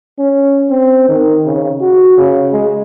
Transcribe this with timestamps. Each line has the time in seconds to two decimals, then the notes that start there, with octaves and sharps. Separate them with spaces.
0.19 C#4
0.70 C4
1.08 D#3
1.45 C#3
1.81 F#4
2.18 C#3
2.52 G#3